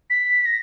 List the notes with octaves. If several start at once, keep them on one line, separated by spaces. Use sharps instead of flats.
B6
A#6